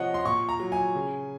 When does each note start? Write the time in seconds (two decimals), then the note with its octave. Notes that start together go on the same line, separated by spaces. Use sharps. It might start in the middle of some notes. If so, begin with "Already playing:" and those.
Already playing: C3 F3 C#5 D#5 F#5
0.14 C6
0.25 A#2 C#6
0.49 A#5
0.60 F#3
0.72 G#5
0.96 C#3